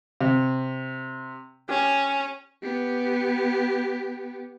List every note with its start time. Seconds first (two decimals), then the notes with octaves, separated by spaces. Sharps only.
0.21 C3
1.69 C#4 G4
2.63 B3 G4